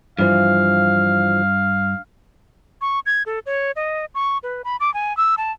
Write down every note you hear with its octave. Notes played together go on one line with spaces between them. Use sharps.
G2 E3 F3 F5
C#6
G#6
A4
C#5
D#5
C#6
B4
B5
D6
G#5
E6
A5